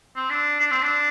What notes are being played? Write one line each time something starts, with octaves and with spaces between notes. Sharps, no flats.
C4
D4
D4
C4
D4